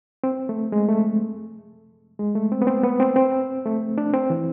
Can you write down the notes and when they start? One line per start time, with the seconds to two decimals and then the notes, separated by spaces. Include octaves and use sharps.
0.24 C4
0.49 A3
0.72 G#3
0.88 A3
2.19 G#3
2.35 A3
2.52 C4
2.62 B3
2.67 C4
2.83 B3
3.00 C4
3.16 C4
3.66 A3
3.98 D4
4.13 C4
4.30 E3